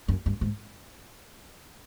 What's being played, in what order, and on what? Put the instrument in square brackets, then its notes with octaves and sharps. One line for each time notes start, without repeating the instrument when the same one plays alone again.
[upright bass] F#2
G2
G#2